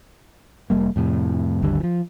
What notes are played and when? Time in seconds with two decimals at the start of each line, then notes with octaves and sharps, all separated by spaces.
0.70 F1 G3 A#3
0.96 F2 A2 C3
1.62 G#1 D#2 D3 G3
1.80 E3 F3